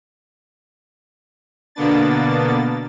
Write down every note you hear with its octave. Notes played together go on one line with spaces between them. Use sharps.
B2 D3 A#3 B3 D4 A6